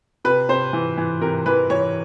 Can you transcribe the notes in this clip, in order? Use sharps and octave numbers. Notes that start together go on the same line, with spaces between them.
C3 B4
C3 C5
E3
E3
C3 A#4
E3 B4
E3 C#5